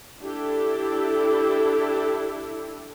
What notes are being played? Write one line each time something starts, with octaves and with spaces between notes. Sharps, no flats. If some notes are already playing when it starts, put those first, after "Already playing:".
D4 E4 G4 A4